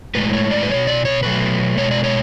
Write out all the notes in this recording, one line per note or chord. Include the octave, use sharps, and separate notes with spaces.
A2 G#3 B4
C#5
D5
B4
B2 G#3 C#5
D5
C#5
B2 F#3 A3 B4
B2 G#3 C#5
D5
C#5